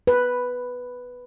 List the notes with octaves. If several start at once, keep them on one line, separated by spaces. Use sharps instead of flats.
B4